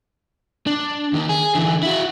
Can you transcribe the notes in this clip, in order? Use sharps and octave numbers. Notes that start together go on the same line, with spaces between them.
D4
D#2 D#3
G#4
D3 E3
E4 F#4